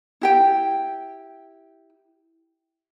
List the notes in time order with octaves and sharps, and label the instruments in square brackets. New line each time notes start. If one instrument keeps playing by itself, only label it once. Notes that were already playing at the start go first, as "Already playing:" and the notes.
[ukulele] E4 G4 G5